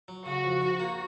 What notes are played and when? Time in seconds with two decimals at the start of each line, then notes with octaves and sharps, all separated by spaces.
0.08 F#3
0.26 C#3 F#4
0.44 F2
0.61 G#2
0.80 A#3